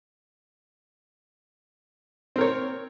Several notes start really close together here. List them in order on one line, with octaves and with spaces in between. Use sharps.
C4 A#4 C#5